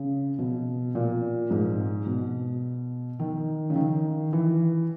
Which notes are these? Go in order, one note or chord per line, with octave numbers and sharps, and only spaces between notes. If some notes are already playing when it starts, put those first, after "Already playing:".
Already playing: C#3
B2
A#2
G#2
B2
D#3
C#3
D#3
E3